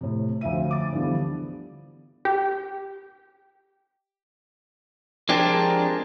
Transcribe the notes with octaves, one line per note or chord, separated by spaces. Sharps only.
A2 C3
D2 F3 E5 D#7
D6 A6
D3 E3 F3 G3 B3
G4
F3 G#3 C4 D4 G4 G#4 A#4 A5